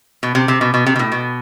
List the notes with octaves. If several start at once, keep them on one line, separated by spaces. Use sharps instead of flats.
B2
C3
C3
B2
B2
C3
B2
A2
B2